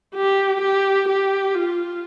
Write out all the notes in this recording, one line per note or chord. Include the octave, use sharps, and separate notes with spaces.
G4
G4
G4
F4